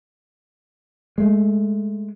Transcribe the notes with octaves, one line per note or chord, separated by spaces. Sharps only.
G#3 A3